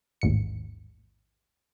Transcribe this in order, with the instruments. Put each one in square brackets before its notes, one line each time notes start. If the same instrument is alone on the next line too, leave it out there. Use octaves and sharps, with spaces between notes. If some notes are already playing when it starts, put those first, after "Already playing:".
[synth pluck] A1 D#2 G#2 C#7